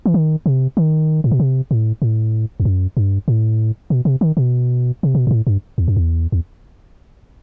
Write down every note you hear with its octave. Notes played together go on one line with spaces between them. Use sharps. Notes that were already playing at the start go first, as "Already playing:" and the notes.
E3
D#3
C3
D#3
A2
B2
C3
A2
A2
E2
F#2
G2
A2
B2
C3
D#3
B2
C3
B2
G2
A2
G2
E2
F#2
E2
E2